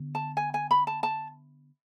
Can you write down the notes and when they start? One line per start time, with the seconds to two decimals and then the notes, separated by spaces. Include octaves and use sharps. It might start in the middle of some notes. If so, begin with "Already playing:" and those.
Already playing: D3 B3
0.15 A5
0.37 G#5
0.54 G#5
0.71 B5
0.87 A5
1.03 A5